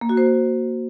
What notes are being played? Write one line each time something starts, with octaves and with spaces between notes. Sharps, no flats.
A#3
F#4
C5